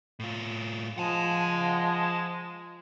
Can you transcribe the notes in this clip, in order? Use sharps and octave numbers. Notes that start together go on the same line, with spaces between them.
A2 F4
F3 G#3 F#5 A5